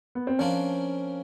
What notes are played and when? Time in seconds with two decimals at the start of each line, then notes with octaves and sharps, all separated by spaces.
0.15 B3
0.27 C4
0.39 F3 A#3 C#4 D4 F4